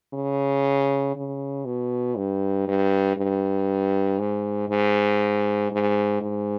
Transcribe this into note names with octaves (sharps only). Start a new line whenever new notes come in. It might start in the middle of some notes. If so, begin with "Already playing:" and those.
C#3
C#3
B2
G2
G2
G2
G#2
G#2
G#2
G#2